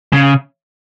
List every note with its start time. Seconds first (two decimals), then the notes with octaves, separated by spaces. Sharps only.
0.13 C#3